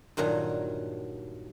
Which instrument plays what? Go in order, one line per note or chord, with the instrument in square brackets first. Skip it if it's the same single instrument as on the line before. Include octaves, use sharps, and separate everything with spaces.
[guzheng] G2 A#2 D#3 F#3